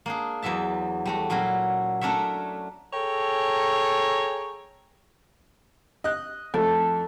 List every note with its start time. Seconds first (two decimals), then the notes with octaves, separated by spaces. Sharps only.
0.06 A#3 D4 G#4
0.42 E2 E3 F#3 E5 A5
1.06 G3 A3 F#4
1.30 A#2 F#3 C#4 E4 F#4
2.01 A3 C#4 D4 A#4 C#5 E5
2.93 G#4 A4 C#5 G5 A#5
6.04 D#5 F#6
6.54 F2 A3 A4